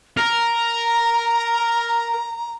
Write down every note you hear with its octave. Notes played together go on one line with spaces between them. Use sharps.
A#4 A#5